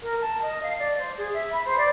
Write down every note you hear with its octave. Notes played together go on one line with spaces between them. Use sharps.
A#4
A5
D#5
F5
D5
C5
G#4
E5
B5
C5
D5